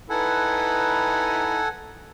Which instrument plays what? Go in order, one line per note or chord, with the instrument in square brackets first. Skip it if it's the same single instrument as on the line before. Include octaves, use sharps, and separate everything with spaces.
[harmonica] D#4 E4 B4 [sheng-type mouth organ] A4 F#5 G#5